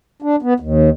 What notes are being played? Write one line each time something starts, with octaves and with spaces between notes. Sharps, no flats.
D4
B3
D#2